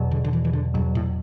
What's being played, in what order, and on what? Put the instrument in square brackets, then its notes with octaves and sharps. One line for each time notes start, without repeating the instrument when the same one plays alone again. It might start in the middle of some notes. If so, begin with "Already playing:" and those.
Already playing: [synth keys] E2 B2 F#3
[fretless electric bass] D3
D3
E3
E3
D3
[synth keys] E2 B2 F#3 [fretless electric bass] G2
[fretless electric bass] A2